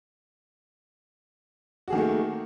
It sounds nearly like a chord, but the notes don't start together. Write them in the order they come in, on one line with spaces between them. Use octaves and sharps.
F#4 G#4 D#3 A#3 A3